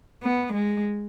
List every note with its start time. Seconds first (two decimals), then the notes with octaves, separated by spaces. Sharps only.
0.24 B3
0.54 G#3